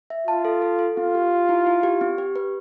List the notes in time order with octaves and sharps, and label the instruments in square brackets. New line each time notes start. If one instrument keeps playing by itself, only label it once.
[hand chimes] E5
[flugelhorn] F4 [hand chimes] A5
[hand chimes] A4
A4
A4
[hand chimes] C4 [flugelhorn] F4
[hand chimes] G4
G4
E4
E4
G4
C4
G4
B4